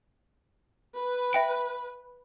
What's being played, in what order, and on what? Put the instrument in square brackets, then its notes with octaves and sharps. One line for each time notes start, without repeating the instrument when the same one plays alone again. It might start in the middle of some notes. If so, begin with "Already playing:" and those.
[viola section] B4
[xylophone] E5 G5 D7